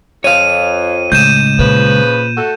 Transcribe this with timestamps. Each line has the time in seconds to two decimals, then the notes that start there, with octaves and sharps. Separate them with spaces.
0.24 F2 C#5 F5 D#7
1.12 C#2 A2 G6 D#7 E7
1.59 A#2 C#3 F3 B4
2.37 A3 F#4 A4